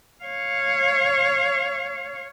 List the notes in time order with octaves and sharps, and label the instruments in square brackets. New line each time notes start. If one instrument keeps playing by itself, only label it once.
[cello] C#5 F5